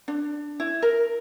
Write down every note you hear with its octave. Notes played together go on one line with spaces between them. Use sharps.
D4
E4
A#4